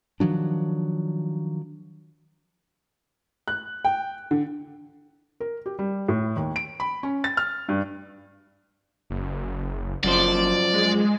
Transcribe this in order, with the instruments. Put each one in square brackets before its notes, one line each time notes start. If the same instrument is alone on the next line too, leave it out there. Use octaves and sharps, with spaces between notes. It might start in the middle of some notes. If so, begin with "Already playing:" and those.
[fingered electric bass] D#3 F3 F#3 D4
[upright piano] F#6
G5
D3
[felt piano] A#4
G4
G3
A2
D#2
D7
B5
C#4
A6
F6
G2
[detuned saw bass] F#1
[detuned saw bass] F#1 [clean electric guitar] F#2 F3 C5 [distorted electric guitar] D5
[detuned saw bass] G#3